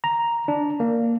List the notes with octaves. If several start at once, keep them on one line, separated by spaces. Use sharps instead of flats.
A#5
D4
A#3